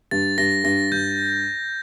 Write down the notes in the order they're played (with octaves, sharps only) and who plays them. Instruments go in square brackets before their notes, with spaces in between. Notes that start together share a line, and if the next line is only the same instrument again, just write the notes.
[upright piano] G2 [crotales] A6
[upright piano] G2 [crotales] A#6
[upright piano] G2 [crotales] A#6
[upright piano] G2 [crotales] G6